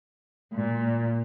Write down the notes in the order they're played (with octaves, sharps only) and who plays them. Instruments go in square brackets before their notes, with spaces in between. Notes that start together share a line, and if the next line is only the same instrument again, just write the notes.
[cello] A#2